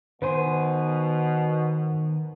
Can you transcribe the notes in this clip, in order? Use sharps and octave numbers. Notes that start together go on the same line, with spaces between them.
B2 D#3 B3 B4 C5 G#5 C6